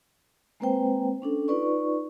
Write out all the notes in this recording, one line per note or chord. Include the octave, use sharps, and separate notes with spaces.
G#3 A#3 C4 B4 C5 G5
C#4 D4 A4
D#4 F4 B4 D5 C#6